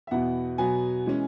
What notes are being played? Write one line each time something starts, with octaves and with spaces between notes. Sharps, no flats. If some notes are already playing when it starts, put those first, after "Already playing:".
E5
E2 B2 B3 E4 F#5
B2 F#3 B3 G#5
E3 G#3 C#4